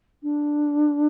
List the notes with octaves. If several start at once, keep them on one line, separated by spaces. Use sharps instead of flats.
D4